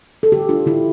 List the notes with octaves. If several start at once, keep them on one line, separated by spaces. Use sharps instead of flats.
A4
D3 G4
D4 F4
D3 E4